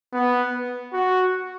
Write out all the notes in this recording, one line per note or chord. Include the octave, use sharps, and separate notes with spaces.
B3
F#4